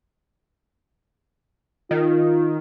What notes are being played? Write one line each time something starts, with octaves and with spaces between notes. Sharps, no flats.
D#3 F4